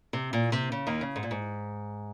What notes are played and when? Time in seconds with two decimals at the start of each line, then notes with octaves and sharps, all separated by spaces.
0.13 C3
0.33 A#2
0.52 C3
0.72 C#3
0.87 D#2 D#3
1.01 C#3
1.16 G#2
1.23 A#2
1.31 G#2